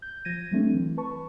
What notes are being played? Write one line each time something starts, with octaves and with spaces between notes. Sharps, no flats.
G6
F3 G#6 A#6 D#7
F#3 G3 A3 C4 D4
E3
B4 A5 C#6